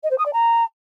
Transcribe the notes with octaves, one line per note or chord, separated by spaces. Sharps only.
D#5
C5
D#6
D5
A#5